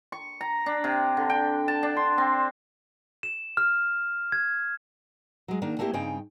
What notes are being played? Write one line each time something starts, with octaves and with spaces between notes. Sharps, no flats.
C#6
A#5
D4
C3
D3
G5
A5
D4
C6
C4
E7
F6
G#6
F#3 G#3
D#3 A#3 D4
A3 A#3 C4 E4 G4
G2 C#3 C4 D#4 G5 G#5